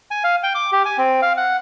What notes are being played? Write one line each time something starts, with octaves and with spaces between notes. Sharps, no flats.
G#5
F5
G5
D6
G4
G#5
C4
F5
F#5